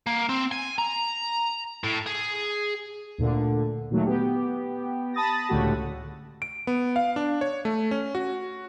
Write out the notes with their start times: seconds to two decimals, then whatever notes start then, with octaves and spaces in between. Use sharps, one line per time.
0.07 A#3
0.29 C4
0.52 G#5
0.78 A#5
1.84 A2
2.06 G#4
3.18 D2 A#2 D3
3.90 A#2 D#3 F#3 A3
4.06 B3 G4
5.14 A5 B5 D#6 A6 A#6
5.49 C#2 A2 D3 A3 F#4 G4
6.42 D7
6.67 B3
6.96 F5
7.16 D4
7.41 C#5
7.65 A3
7.91 C#4
8.15 F#4